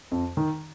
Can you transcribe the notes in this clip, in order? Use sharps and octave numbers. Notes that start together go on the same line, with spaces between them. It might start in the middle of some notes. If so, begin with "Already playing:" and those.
F2
D#3